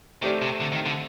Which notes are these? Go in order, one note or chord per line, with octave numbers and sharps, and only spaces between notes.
D#3 A3 C4 G4 D5
C3
D3
D#3
D3